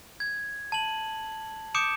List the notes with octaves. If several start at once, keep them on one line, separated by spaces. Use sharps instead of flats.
G#6
A5 F#7
D6 D#6 G6 C#7 D7 E7